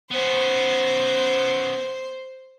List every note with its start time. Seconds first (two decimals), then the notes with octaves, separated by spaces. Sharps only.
0.11 B3 C#4 C5